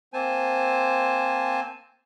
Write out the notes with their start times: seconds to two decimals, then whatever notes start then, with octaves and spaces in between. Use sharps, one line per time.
0.13 A#3 C4 C5 G#5 A5